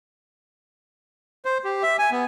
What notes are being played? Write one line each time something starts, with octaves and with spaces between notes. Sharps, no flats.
C5
G4
E5
G#5
B3